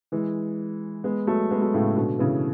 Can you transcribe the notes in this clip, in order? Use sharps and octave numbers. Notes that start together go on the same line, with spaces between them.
E3 G#3
G#3 B3
F#3 A3
G#3 B3
F#3 A3
A2 C#3
B2 D3
C#3 E3